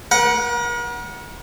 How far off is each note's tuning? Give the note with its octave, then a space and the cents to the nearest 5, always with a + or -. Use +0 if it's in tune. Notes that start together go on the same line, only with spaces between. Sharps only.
A#4 +40 F#5 +0